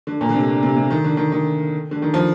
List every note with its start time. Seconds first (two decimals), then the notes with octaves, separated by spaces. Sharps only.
0.07 D3
0.21 A#2
0.29 D3
0.35 C3
0.48 D3
0.63 C3
0.76 C3
0.90 D#3
1.04 D3
1.17 D#3
1.32 D#3
1.91 D3
2.02 D#3
2.14 F3